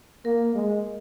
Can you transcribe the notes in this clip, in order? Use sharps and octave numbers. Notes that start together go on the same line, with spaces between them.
A#3 A#4
G#3